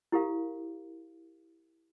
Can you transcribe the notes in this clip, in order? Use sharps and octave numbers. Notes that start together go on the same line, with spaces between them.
E4 G4 A#4 F5